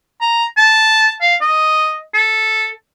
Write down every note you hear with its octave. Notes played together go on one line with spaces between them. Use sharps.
A#5
A5
F5
D#5
A4